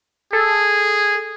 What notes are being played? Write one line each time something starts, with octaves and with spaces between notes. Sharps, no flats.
G#4 A4